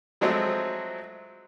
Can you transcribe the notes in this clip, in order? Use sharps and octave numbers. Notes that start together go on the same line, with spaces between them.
F3 F#3 G#3 A3 C4